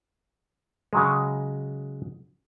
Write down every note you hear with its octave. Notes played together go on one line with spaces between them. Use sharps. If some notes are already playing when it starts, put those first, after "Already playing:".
C#3 F#3 G#3